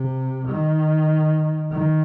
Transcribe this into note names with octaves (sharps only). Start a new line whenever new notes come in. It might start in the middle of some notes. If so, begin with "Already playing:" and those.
Already playing: C3
D#3
D#3